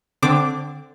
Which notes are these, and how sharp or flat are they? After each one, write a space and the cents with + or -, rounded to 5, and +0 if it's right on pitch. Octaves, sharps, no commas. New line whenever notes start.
D3 +0 C4 +5 D6 +0